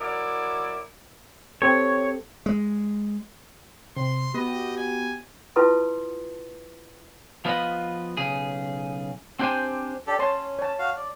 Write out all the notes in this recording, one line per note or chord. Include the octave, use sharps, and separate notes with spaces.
F#3 E4 A#4 D5
C4 G4 A4 C#5
G#3
C3 C6
B3 F#4 G4 D#5
G#5
E4 F4 B4 A5 C6 D#6
F3 B3 F4 F#4 B4 D#5
B1 C#3 G#4
C4 D4 G4 A4 C5 G#5
D4 G4 A4
C#4 C#5 A5 C6
C#5 A5
F#4 F5
D5